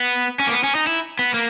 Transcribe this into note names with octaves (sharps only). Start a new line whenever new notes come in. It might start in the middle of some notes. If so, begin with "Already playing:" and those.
Already playing: B3
C#4
A#3
B3
C#4
D#4
E4
B3
A#3